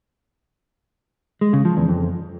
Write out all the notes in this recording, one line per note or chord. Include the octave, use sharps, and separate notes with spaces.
G#3
C#3
F3
E2
F2